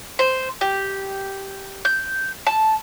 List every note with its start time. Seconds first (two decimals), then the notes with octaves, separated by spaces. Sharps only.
0.19 C5
0.61 G4
1.85 G6
2.47 A5